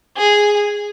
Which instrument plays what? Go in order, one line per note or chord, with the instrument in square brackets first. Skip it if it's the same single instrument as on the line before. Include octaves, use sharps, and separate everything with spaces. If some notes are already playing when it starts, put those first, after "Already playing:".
[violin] G#4